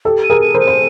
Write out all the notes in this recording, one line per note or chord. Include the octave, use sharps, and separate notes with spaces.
G4 A4
D#7
G#4 A#4
D#7
A#4 C5
D#7
C5